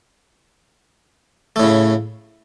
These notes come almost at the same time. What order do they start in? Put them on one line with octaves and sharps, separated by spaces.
A3 A2 C#3